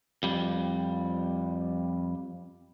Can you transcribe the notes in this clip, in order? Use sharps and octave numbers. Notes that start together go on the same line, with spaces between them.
F2 G3